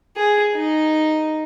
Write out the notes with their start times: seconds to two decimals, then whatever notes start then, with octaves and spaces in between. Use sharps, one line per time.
0.17 G#4
0.54 D#4